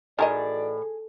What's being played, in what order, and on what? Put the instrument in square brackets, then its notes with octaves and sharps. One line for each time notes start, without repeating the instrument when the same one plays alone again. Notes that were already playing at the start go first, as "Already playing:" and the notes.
[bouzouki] A2 [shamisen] D#3 A#4 D#5 [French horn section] E3 F#4 D5 [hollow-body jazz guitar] G#4